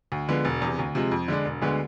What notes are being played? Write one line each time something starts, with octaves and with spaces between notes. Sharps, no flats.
D2
D3 F3 G#3 B3
E1
E2 C3
D2
C3 F3 G#3
F2
D3 G#3 D4
E1
D2 D3 G#3 B3